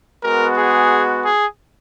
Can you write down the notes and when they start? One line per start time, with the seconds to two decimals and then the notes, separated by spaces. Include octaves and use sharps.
0.24 G#3 B3 F#4 A#4
0.57 G#4
1.24 G#4